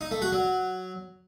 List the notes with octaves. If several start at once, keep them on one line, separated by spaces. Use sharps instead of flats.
D#4
A3
F#4
F#3